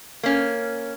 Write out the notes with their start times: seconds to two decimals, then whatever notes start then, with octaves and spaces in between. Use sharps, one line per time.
0.23 A#3 C#4